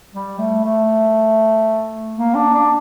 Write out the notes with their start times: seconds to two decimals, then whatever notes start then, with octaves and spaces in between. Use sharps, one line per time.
0.14 G3
0.38 A3
0.64 A3
2.16 A#3
2.34 D4
2.54 D4